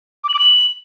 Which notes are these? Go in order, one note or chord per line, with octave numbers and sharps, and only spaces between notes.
D6
F#7
D6
F#7